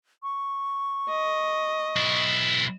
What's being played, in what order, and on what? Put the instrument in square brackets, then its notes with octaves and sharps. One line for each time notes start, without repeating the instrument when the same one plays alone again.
[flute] C#6
[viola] D#5
[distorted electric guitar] B1 E4